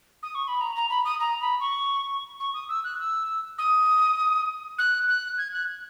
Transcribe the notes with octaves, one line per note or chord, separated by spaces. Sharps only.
D#6
C#6
B5
A#5
A#5
B5
D#6
A#5
B5
C#6
C#6
D#6
E6
F#6
E6
D#6
F#6
F#6
G#6
F#6